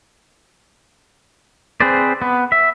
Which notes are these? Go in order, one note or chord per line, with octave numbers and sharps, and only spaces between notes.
C4 G#4 B4 C5 D5
B3
E5